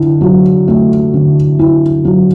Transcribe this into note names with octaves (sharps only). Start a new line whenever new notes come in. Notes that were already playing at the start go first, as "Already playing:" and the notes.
Already playing: D3 E4
F#3
A3
D3
E4
F#3